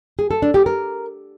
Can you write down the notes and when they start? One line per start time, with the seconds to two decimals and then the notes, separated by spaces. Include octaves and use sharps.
0.19 G#4
0.31 A4
0.42 D4
0.54 G4
0.66 A#4